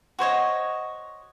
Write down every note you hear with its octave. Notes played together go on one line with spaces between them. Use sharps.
F#4 C5 C#5 D#5